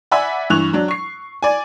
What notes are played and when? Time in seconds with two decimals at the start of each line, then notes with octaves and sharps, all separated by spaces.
0.11 D5 E5 F#5 G#5 B5 E6
0.50 G2 E3 C#6 F#6 F7
0.73 F#3 D4
0.88 C#6 C7
1.42 D5 G#5